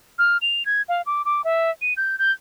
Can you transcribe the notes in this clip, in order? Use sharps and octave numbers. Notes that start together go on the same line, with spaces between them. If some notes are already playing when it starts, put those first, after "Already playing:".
F6
F7
G#6
F5
D6
D6
E5
D#7
G6
G6